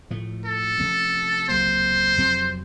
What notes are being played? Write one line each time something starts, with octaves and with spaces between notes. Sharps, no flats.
A2 F3 A3
A4
C3 F3 A3 C#4
C#2 C3 F#3 A#3 C5
F2 C3 F#3 C4